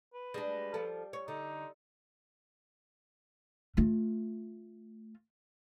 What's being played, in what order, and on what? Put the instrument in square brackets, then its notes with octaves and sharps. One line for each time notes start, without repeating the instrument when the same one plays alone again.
[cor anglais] B4
[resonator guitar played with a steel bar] G3 [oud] G#3 D4
[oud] F3 A4
C#5
[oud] D3 [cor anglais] D#4
[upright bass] A3 F4